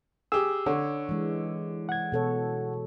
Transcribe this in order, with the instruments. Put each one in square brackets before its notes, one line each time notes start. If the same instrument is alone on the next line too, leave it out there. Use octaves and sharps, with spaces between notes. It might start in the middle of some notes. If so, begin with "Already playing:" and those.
[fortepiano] G4 G#4 [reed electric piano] E6
[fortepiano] D3 [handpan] C#5
[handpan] E3 G#3
[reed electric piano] F#5 G#6
[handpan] B2 A4 C#5